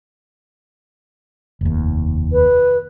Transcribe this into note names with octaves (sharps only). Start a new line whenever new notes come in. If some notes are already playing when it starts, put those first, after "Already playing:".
F1 D#2
B4